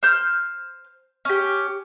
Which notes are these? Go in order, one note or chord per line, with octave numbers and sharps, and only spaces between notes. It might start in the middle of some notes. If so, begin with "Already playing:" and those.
C5 F6 G6
C#4 G4